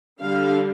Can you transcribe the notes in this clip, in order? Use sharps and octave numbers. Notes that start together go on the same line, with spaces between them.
D3 G3 D4 F5